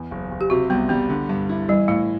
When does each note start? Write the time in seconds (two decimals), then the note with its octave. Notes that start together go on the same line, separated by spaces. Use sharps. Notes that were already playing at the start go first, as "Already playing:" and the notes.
Already playing: E2
0.11 F#1
0.31 F#1
0.41 G4
0.50 C3 F#4
0.70 C2 B3
0.89 G3 B3
1.09 D3
1.29 G2
1.49 E4
1.69 E3 G3
1.88 A2 A3